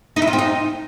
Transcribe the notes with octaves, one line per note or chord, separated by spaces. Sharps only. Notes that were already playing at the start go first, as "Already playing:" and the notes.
D#4
E4
F4
C4
D#4